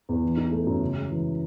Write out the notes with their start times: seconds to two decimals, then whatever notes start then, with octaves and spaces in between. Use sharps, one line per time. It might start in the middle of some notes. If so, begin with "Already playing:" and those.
0.09 E2
0.23 E3
0.37 D#4
0.52 A3
0.67 F#2
0.82 C#3
0.96 G#3
1.10 E3